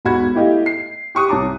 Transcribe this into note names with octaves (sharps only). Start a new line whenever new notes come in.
E1 B1 F#4 B5 G#6
A3 E4 G4 D#5 F5
C7
G4 C#6 D#6 F#6
C2 C#5 A5 A#5 D6